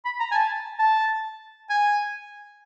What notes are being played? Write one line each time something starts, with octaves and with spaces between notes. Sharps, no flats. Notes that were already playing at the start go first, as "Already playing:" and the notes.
B5
A#5
G#5
A5
A5
G#5